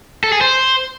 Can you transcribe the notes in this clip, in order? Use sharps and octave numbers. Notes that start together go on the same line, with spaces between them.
A4
G#4
C5